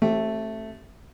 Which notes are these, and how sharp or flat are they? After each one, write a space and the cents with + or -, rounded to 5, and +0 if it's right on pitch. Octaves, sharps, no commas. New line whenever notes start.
A3 +0 C4 +35 G4 -30